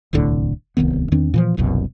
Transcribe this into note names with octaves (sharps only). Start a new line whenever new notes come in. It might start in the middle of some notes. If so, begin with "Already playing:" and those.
D1 C2 A2 D3
D1 C2 D#3 B3
E2 D#3 C4 D4
A#2 E3 F3
F#1 C2 F#2 B2